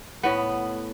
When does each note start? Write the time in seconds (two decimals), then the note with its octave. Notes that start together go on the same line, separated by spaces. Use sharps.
0.23 A2 B3